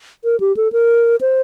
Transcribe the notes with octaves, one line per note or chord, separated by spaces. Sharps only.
A#4
G4
A4
A#4
C5